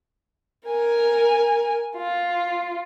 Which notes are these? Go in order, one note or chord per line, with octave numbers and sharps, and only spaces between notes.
A#4 G#5
F4